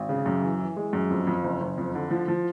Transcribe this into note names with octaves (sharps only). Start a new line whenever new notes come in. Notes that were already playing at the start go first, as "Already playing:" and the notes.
Already playing: G#1
C#3
F#2
E3
E3
G#3
F#2
F2
F2
F#1
F#1
F2
D3
F3
F3